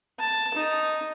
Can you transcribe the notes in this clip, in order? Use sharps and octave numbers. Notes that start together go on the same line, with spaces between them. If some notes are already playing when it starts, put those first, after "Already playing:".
A5
D#4